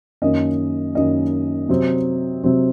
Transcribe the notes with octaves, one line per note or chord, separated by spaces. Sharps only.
F#2 D#3 A#3 C#4 D#5
F#2 D#3 A#3 C#4 D#5
C3 F#3 C4
C3 F#3 C4